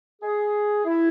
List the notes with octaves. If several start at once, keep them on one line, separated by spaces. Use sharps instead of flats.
G#4
E4